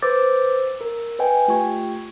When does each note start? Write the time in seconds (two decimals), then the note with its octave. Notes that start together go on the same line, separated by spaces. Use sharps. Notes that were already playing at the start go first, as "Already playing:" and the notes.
0.02 B4 C5 D6 E6 G6 A6
0.81 A#4
1.19 B4 D#5 G5 G#5
1.48 A3 F4 G4 G5 C#6 G#6